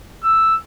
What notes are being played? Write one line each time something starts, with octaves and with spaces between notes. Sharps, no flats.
E6